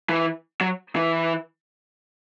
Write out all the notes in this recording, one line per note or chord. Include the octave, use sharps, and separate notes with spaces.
E3
F#3
E3